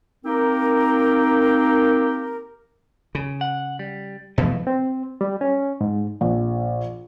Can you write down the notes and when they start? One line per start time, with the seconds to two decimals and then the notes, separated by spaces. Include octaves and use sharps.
0.25 A#3 C4 D#4 G4 A#4
3.15 C#3
3.41 F#5
3.79 G3
4.38 B2 E3 F3 A3
4.67 C4
5.21 G3
5.41 C#4
5.81 G#2
6.21 A#1